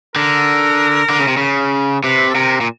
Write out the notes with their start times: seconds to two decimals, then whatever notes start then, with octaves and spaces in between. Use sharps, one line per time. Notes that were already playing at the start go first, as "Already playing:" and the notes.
0.15 D3 A#4
1.10 D3
1.19 C#3
1.28 C3
1.37 C#3
2.04 C3 B4
2.30 A4
2.35 C3 A#4
2.61 A#2